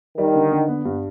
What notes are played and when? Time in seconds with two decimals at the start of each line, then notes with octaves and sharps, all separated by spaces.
0.18 D#3 G3
0.35 D3
0.52 D3
0.68 B3
0.85 G2